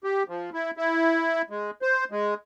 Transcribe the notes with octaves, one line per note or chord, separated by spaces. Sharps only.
G4
F3
E4
E4
G#3
C5
G#3